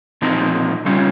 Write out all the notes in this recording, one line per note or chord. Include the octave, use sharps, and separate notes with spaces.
A#2 F3 C4 D#4
C#3 G3 C#4 F4